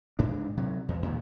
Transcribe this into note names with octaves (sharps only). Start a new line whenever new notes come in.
G#2 D4
C3 F#3
E2
E2 A#2 D#3